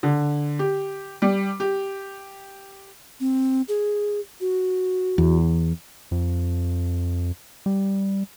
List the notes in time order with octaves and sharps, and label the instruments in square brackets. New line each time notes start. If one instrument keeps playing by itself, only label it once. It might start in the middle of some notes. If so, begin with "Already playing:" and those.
[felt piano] D3
G4
G3
G4
[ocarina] C4
G#4
F#4
[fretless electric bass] E2
[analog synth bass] F2
G3